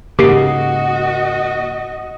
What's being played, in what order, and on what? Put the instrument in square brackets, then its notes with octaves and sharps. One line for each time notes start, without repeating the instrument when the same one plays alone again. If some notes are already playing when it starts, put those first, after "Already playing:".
[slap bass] G#2 C#3 [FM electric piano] A#3 [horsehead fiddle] F#4 D#5 [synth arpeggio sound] G4 C7